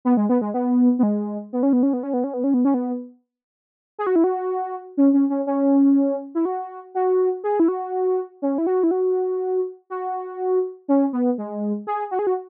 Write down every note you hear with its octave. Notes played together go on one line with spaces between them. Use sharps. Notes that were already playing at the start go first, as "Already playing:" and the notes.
B3
G#3
B3
G#3
B3
B3
G#3
B3
C#4
B3
C#4
B3
C#4
B3
C#4
B3
C#4
B3
C#4
B3
G#4
F#4
E4
F#4
C#4
C#4
C#4
C#4
E4
F#4
F#4
G#4
E4
F#4
C#4
E4
F#4
E4
F#4
F#4
C#4
B3
G#3
G#4
F#4
G#4
F#4